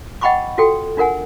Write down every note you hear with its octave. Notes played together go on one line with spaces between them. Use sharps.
D#5 F#5 G5 B5 C#6 D6
F4 F#4 A4 G5
D4 F4 A#4 F#5 G#5